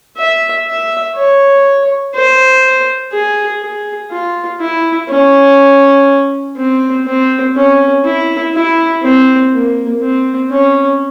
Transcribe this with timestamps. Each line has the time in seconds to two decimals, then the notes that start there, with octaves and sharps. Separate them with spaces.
0.17 E5
0.66 E5
1.16 C#5
2.14 C5
3.12 G#4
3.61 G#4
4.11 F4
4.60 E4
5.09 C#4
6.57 C4
7.06 C4
7.55 C#4
8.04 E4
8.54 E4
9.02 C4
9.52 A#3
10.01 C4
10.50 C#4